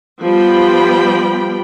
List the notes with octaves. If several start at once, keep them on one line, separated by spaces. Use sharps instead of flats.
F3 G3 B3 G5 B5